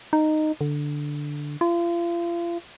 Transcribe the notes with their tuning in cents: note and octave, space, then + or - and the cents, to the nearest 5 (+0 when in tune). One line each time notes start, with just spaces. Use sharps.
D#4 -10
D3 +0
F4 -35